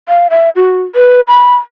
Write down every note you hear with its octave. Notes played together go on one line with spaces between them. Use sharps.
F5
E5
F#4
B4
B5